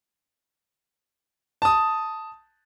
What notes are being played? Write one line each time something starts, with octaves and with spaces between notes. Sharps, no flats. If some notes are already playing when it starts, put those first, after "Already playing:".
A5 D#6